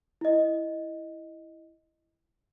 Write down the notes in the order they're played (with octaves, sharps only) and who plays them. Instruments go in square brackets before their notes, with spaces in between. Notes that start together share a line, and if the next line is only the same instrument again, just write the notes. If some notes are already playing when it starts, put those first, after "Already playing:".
[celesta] E4 D#5